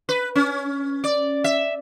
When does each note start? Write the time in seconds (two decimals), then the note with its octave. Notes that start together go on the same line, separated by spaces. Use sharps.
0.09 B4
0.35 C#4
1.04 D5
1.44 E5